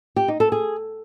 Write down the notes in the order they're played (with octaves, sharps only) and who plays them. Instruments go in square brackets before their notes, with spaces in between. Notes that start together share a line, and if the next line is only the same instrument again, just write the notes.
[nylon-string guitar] G4
D#4
A4
G#4